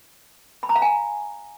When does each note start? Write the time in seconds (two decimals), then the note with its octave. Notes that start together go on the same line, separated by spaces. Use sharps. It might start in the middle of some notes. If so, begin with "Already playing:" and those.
0.63 B5
0.69 A#5
0.76 F5
0.82 G#5